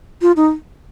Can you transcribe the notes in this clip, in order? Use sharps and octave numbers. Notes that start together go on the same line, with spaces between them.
F4
D#4